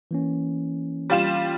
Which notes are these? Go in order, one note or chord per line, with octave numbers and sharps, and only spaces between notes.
E3 A#3 C#4
G3 F4 E7